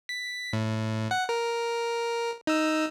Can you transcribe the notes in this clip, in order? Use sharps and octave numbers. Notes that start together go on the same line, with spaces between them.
B6
A2
F#5
A#4
D#4 E6